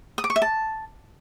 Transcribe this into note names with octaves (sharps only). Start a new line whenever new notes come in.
D#6
D6
C#6
E5
A5